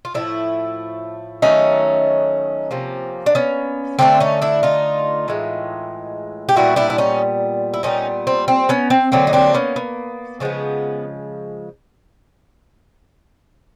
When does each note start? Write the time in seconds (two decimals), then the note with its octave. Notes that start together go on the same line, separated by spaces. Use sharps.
0.05 F4
0.14 A2 F3 A3 D4 E4
1.42 D#3 F#3 A3 C#4 D#4
2.71 C3 F3 A#3
3.26 D4
3.35 B3 C#4
3.99 D3 F#3 A3 C4 D4
4.20 C#4 D#4
4.42 D4 E4
4.63 D#4 F4
5.28 A2 E3 G#3
6.49 G4
6.56 A#2 G3 B3 E4 F#4
6.76 D4 E4
6.90 E4
6.98 C#4 D#4
7.74 E4
7.83 A#2 G3 B3 C#4 D#4
8.27 C4
8.48 C4
8.69 B3 C#4
8.90 C4
9.12 D3 F#3 A#3 C4
9.27 D#4
9.33 C4 D4
9.54 B3 C#4
9.76 B3
10.40 C#3 F3 G#3 B3